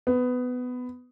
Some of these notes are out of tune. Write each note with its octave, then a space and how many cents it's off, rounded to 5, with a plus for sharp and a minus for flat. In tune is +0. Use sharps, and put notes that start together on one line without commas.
B3 +15